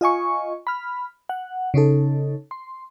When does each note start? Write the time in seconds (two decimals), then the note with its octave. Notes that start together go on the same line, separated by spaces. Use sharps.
0.01 F4 D#5 G#5 C#6
0.67 B5 F6
1.29 F#5
1.74 C#3 C#4 D#4 A4
2.51 C6